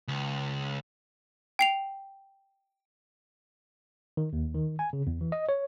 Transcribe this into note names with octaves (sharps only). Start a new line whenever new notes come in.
C#2
G5 C7 F7
D#3
D#2
D#3
G#5
C#3
E2
E3
D#5
C#5